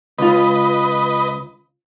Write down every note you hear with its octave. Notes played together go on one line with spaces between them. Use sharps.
C#2 F4 B4 D#5